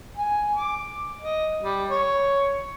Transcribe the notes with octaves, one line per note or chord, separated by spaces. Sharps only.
G#5
D6
D#5
G3
C#5